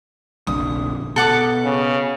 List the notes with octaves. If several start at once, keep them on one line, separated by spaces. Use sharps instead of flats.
F1 A#1 D3 D#6
B2 A4 F#5 D6
C#3